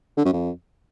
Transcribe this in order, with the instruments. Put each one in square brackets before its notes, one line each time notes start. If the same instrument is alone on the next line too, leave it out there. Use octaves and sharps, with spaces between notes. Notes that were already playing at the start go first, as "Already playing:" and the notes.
[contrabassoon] D3
F#2
F2